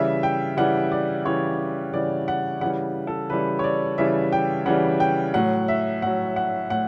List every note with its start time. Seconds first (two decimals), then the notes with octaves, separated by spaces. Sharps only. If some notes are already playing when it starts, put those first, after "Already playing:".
Already playing: C#3 E3 G3 E5
0.23 G5
0.57 C#3 E3 G3 F#5
0.92 D5
1.25 C#3 E3 G3 C#5
1.93 C#3 E3 G3 D5
2.28 F#5
2.61 C#3 E3 G3 F#5
3.07 A4
3.30 C#3 E3 G3 B4
3.59 C#5
3.64 D5
3.98 C#3 E3 G3 E5
4.32 G5
4.66 C#3 E3 G3 F#5
5.00 G5
5.34 A2 F#3 F#5
5.68 E5
6.02 A2 F#3 F#5
6.36 F#5
6.70 A2 F#5